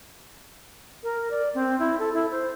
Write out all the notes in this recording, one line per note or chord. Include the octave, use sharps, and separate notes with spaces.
A#4
D5
C4
E4
A4
E4
C5